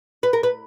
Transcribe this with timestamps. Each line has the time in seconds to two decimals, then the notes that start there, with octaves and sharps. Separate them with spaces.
0.23 B4
0.33 A#4
0.43 B4